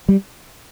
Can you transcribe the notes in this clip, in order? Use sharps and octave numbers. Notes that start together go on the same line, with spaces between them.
G3